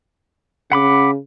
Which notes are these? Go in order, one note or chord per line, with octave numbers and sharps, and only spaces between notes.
C#3 F#5 B5 D6